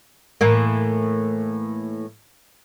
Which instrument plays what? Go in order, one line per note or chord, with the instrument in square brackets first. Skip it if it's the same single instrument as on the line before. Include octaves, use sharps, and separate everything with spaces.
[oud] A2 E3 A#3